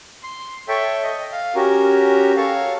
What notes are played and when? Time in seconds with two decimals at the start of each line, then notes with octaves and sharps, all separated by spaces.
0.23 C6
0.68 A4 C#5 E5 G5
1.03 D#5
1.32 F5
1.55 C#4 F#4 G4 A#4
2.36 A4 C#5 F5